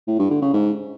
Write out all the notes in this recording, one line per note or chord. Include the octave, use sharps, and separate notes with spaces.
A2
G2
D3
C#3
G#2